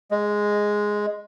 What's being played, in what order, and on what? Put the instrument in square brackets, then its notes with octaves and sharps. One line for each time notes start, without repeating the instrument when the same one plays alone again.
[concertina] G#3